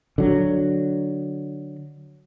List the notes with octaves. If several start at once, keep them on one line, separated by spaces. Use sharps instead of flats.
D3 F#3